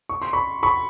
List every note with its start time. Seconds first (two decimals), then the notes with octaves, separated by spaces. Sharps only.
0.09 C#6
0.22 C6
0.33 B5 C#6
0.63 B5 C#6